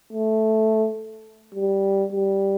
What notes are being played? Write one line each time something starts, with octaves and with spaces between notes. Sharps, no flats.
A3
G3
G3